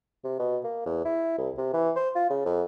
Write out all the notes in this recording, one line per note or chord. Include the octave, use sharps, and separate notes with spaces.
C3
B2
A#3
E2
E4
C2
C3
E3
C5
F4
C#3
F2